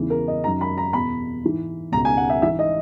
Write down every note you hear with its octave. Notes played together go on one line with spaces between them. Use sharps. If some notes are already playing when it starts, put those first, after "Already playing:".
Already playing: E2 C#3 E3
A#4
D#5
F#2 D#3 A#5
B5
A#5
E2 B2 B5
G#2 E3
C#2 B2 A#5
G#5
F#5
E5
G#2 E3 E5
D#5